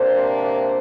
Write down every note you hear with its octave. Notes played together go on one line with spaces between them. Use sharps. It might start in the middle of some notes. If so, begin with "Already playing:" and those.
Already playing: C3 A#3 D4 C5
C5